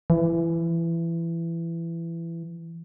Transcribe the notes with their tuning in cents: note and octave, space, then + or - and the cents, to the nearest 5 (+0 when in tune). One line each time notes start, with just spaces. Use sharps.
E3 +20